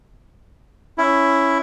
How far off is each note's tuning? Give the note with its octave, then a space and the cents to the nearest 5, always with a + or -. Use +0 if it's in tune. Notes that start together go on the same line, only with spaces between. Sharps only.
C#4 +0 E4 +5